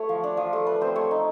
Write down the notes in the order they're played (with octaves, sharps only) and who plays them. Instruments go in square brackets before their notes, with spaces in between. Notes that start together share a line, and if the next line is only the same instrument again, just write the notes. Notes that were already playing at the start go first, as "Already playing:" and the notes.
Already playing: [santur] A3 C#5
F3
D4
F3
A3
A3 B4
C4 C5
A3 C#5
D#4